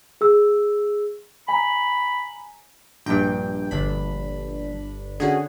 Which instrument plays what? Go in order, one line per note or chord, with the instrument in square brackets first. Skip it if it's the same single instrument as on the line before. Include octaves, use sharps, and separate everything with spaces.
[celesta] G#4 E6
[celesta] G#5 A#5 [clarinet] B5
[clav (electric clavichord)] A#1 G2 [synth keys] G5
[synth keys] G1 D4 B5
[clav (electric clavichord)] D3 [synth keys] C#4 F#4 G#4